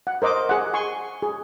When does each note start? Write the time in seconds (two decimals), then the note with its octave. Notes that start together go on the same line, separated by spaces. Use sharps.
0.07 F#5
0.22 A#4 C5 D#5 D6
0.49 G#4 F#5
0.74 G#5 C6 C#6
1.22 G#4